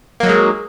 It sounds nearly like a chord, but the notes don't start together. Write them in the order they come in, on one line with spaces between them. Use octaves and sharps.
A#3 F#3 D#4 G#3